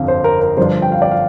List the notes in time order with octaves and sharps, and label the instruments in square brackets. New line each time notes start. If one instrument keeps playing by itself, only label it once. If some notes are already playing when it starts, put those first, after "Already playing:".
Already playing: [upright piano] G1 F2 D3 F3 [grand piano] F5
[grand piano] C5
A#4
A#4
[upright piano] G1 G2 F3 D4 F4 [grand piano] C5
[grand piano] G5
F5
D5
F5